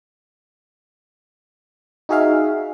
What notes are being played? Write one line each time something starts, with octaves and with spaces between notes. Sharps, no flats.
D#4 F#4 G#4 E5 F5